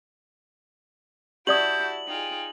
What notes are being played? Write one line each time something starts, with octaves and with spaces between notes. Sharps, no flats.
E4 F#4 G4 D5 A5 D#6 G6 F#7
D#4 F4 G#4 G5